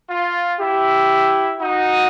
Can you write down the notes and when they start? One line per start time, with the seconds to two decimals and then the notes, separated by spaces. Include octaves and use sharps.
0.09 F4
0.60 E4 G4
1.60 D#4 F#4